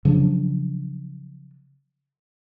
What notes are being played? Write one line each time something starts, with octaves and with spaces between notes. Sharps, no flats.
C#3 F3 F#3 D4